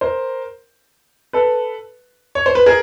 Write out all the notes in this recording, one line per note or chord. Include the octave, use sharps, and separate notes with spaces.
A#4 C5
A4 B4
C#5
C5
B4
G#4 A#4